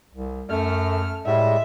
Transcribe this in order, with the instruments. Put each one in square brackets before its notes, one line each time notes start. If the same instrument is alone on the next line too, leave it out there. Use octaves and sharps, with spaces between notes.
[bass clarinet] C2
[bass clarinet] F#2 [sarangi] A3 [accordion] F6
[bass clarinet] A2 [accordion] G3 G#3 [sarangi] E5